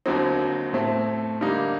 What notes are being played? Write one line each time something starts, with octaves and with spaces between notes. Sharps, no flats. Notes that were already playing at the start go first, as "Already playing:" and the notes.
D#2 D3 F#3 C4 D#4
A2 A3 C4
D3 G3 A#3 D#4